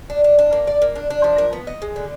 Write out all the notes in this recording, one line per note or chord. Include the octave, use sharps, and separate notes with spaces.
D4
D4
D4
A#3
D5
A#3
D4
D4
F3
A#4
B3
D#5
G#3
D3